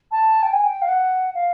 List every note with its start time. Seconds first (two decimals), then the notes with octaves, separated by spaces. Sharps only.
0.12 A5
0.43 G5
0.53 G#5
0.64 G5
0.82 F5
0.88 F#5
1.35 F5